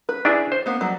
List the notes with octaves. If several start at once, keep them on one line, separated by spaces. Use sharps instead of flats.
B4
D4 E4 G#4
C5
A#3 B3
F#3 G3